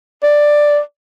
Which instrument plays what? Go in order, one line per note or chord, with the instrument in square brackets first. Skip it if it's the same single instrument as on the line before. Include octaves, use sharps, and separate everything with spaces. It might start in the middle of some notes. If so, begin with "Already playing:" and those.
[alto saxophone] D5